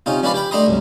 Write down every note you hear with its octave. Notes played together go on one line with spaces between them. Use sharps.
C3 C#4 D#4 F4
F3 C#4 D4 B4 D5 F5
G4 G5 B5
A3 D4 D#5 A#5 C6 D#6
C2 F#2